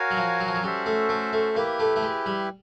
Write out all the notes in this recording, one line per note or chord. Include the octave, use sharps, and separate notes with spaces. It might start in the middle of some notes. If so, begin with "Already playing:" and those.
Already playing: F#4 A#4 C#5 F5 G#5
F#3
F3
F#3
F3
F#3
G3 C#4 F#4 A4 C5 E5
A3
A3
A3
A#3 E4 G4 B4
A3
A3
G#3
G3